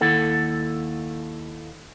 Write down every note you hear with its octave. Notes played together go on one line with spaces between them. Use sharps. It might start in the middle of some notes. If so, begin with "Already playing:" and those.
D#2 E4 A4 F#5